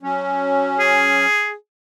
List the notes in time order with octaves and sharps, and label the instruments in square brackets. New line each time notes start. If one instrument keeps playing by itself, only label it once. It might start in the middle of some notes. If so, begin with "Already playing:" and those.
[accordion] F#3 C#4
[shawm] G#4